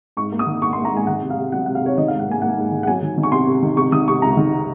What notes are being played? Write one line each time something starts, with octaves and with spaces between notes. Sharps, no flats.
G#2 C#6
A#3
D#6
D#3
A#3 C#6
C6
A#3
A#5
G#2 G#5
D#3 F#5
C3
F5
C3
F#3 F#5
C3 F#5
F5
C3 C#5
D#3 D#5
F5
G#2
F#5
A#3 G#5
A#3 F#5
G#2
D#3
F#5
F#3 G#5
D#3
D#3
C#6
C3 C6
C3
D#3
C3 C#6
D#3 D#6
C3 C#6
C#2 A#5
D#3